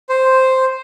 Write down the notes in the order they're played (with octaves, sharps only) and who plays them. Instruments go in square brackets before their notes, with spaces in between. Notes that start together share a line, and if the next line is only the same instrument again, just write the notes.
[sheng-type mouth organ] C5